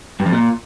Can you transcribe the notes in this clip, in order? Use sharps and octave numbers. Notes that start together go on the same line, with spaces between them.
G2
F2
A#2